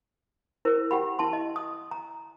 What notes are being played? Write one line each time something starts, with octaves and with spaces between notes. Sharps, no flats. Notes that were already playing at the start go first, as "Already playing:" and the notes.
E4 A#4 C5
G4 F#5 G5 B5
E4 A5 C6
D#5
D#6
A#5